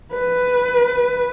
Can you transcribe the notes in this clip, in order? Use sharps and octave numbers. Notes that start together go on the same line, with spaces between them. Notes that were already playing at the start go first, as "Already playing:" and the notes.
B4